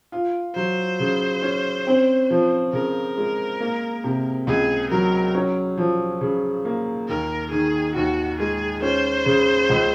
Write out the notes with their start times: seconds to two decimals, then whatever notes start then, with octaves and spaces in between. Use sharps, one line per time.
0.12 F4
0.55 F#3 C5
1.00 C#3
1.42 C#4
1.87 C4
2.30 F3
2.73 C#3 A#4
3.17 G#3
3.60 A#3
4.04 C3
4.47 C#2 G#4
4.91 F#3 A#4
5.35 C#4
5.77 F3
6.21 C#3
6.65 A#3
7.08 D#2 A#4
7.52 D#3 G#4
7.95 D#2 F#4
8.39 G#3 G#4
8.82 C#4 C5
9.26 C#3
9.69 C#2